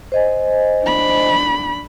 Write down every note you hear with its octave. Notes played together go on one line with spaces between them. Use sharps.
C5 D#5 G#5
D4 B5